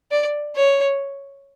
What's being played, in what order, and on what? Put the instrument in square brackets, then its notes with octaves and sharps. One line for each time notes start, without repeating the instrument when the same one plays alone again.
[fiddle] D5
C#5